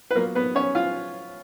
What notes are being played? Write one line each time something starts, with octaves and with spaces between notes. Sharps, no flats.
B4
F#3 A#3 B3 F4 A#4
B3 B4
C#4 C#5
F4 F5